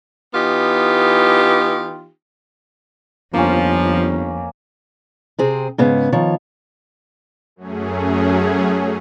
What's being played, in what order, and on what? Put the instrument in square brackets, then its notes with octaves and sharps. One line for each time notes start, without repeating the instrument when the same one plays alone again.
[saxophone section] E3 B3 D#4 F4 G4
[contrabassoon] G1 [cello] F2 [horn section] F3 [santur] A#3 C#4
[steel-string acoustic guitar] C3 C4 G#4
G#2 C#3 B3
D#3 F3 C#5
[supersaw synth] F#2 F#3 A3 C#4 G#4